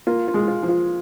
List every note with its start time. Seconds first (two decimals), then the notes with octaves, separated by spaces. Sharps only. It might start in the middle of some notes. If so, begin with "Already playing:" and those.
0.07 A#3 F4
0.28 F4
0.34 G#3
0.48 F4
0.63 F3
0.69 F4